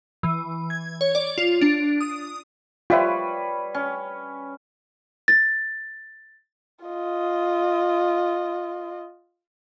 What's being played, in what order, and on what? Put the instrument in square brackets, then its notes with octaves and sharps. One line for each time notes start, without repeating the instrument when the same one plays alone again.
[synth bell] E3
G#6
C#5
D5
F4
D4
D#6
[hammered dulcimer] G3 B4 C#5 [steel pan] F4 E5
[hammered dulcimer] C#4
[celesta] A6
[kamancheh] F4 D#5